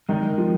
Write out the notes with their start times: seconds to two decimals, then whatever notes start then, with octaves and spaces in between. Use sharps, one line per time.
0.09 D#3 G#3 D#4 A#4 D5
0.38 F3